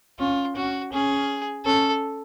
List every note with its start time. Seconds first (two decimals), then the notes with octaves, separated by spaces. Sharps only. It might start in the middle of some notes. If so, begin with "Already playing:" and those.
0.19 C#4 F4
0.56 C#4 F#4
0.93 C#4 G#4
1.66 C#4 A4